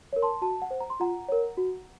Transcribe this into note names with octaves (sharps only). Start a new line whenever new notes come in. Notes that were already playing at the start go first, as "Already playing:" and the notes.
A#4 C#5
A5 C6
F#4 A5
F#5
C5
A#5
C6
F4 F#5 A#5
A#4 C#5
F#4